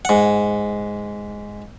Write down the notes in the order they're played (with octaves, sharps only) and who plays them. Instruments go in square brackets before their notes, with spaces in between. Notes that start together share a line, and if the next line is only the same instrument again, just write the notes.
[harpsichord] G#2 F#5